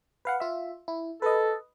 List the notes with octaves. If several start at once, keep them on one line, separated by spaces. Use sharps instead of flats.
B4 F5 F#5
F4 E5
E4
A4 B4 D#5